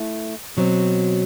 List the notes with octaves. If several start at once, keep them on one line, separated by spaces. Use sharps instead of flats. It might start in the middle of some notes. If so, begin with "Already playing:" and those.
Already playing: A3 E4
B2 F#3 C4